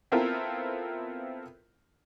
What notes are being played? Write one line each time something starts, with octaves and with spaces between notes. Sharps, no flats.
B3 C4 E4 F4 A4 A#4